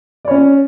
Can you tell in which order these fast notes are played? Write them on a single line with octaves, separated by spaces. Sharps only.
D5 C#5 C#4